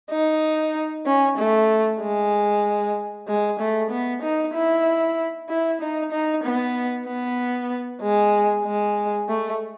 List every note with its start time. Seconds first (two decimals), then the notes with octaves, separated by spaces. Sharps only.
0.11 D#4
1.06 C#4
1.38 A3
2.01 G#3
3.27 G#3
3.59 A3
3.90 B3
4.22 D#4
4.54 E4
5.49 E4
5.81 D#4
6.12 D#4
6.43 B3
7.07 B3
8.02 G#3
8.65 G#3
9.28 A3